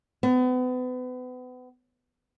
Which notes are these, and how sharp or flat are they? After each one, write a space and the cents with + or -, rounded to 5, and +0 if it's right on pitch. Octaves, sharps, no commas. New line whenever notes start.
B3 +35